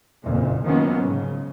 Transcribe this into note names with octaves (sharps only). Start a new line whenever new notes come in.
F#1 F2 A#2
D#3 F3 F#3 A#3 B3 C#4
G#2 C#3